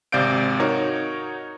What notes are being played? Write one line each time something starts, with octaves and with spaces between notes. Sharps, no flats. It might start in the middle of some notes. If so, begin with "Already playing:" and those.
G#1 C3 D5 F5 G6 D7
D#4 F#4 A#4 C#5